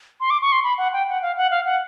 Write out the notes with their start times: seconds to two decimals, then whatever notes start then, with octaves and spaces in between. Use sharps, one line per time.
0.20 C6
0.30 D6
0.42 C#6
0.52 C6
0.64 B5
0.78 F#5
0.93 G5
1.08 F#5
1.22 F5
1.37 F#5
1.51 F5
1.65 F#5